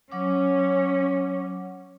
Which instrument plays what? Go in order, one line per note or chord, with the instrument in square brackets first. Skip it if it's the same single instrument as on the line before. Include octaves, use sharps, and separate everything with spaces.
[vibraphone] F#3 F#5 D6 [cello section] C#4